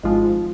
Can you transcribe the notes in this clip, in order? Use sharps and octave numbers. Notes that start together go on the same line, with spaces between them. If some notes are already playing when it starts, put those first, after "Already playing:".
G#1 G#2 F3 G#3 F4